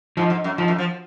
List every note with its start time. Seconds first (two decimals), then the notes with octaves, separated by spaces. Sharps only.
0.17 G#2 F3
0.30 G#2
0.44 F#2
0.58 G#2 F3
0.68 F#2
0.78 F3